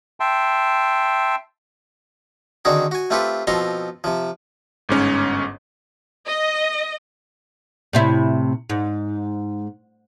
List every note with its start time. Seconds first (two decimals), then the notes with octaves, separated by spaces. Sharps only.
0.20 E5 G5 A5 C6
2.65 D3 D#3 C4 F#4 G#4
2.91 F#4 G#5
3.10 A3 C4 F4 G4 A4 B4
3.47 B2 F3 C4 A4 A#5 C6
4.04 C3 F3
4.89 G1 G#2 C#4 C#5
6.28 D#5
7.93 A2 C3 E4
8.70 G#2